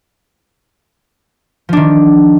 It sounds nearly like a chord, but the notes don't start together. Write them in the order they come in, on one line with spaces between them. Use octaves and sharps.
F3 D4 D#3